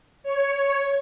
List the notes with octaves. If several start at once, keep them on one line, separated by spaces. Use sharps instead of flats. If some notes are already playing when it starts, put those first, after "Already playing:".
C#5